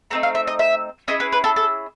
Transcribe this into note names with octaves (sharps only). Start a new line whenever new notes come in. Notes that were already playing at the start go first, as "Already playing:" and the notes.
A3 C4 D#4 A#5
F5
E5
D#5
E5
C#4 E4 G#4 D#5
B4
B4
A4
A4